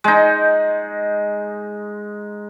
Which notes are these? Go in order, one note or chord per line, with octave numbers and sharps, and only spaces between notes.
G#3 D#4